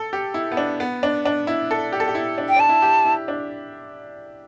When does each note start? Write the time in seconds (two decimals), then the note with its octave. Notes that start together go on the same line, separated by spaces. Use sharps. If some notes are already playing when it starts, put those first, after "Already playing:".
Already playing: A4
0.13 G4
0.34 E4
0.52 B3
0.57 D4
0.80 B3
1.03 D4
1.26 D4
1.47 E4
1.71 A4
1.92 G4
2.00 A4
2.08 G4
2.15 E4
2.38 D4
2.49 G5
2.56 D4 A5
2.69 E4
2.82 G4
3.05 E4
3.28 D4